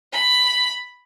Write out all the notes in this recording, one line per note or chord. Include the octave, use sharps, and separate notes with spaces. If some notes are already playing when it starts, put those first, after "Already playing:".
B5